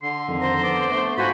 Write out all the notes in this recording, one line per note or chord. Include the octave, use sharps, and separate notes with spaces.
D3 C6
F2 D#3
C5 A#5
B3 D5
A3
G#2 F4 F#4 C5 G#5 B5